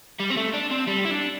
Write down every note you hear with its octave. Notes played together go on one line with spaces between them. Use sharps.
G3
C4
A3
D4
C4
G3
E4
D4